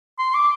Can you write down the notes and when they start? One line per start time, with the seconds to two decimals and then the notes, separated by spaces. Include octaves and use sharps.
0.19 C6
0.34 D6